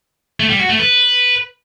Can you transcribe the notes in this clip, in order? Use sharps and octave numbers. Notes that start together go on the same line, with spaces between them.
A3
G3
F#4
A3
B4